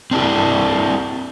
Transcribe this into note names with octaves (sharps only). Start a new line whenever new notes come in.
C4 D4 E4 G4